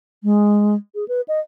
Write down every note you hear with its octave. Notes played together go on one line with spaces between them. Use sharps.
G#3
G#4
B4
D#5